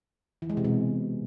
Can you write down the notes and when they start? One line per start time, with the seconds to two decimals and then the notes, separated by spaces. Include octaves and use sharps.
0.42 E3
0.50 G#3
0.57 C3
0.64 B2